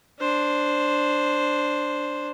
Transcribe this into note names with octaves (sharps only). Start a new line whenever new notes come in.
D4 C5